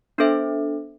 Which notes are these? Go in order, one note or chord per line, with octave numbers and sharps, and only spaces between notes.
B3 D4 A4 C5 E5